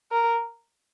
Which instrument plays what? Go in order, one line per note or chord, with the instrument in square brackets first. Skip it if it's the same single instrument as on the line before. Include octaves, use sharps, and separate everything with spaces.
[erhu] A#4